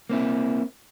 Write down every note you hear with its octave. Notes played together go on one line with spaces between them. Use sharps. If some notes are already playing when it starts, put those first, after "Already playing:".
A#3 C4 E4